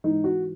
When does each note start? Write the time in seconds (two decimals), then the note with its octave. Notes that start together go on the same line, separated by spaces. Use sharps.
0.04 G#2 E3 D#4
0.24 F#4